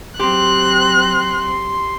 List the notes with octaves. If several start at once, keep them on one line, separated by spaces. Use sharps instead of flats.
F#3 C4 G4 C6 F#6